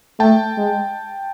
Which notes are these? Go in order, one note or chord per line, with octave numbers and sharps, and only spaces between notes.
A3 G5 A5
G#3